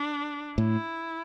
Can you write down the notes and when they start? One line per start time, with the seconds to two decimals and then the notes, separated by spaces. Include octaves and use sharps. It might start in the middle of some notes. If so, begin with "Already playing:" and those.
Already playing: D4
0.58 A2 E4